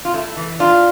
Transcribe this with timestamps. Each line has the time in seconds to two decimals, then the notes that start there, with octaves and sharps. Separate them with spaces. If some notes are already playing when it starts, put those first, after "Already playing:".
0.05 F4
0.14 A3 E4
0.37 E3
0.60 D4 F4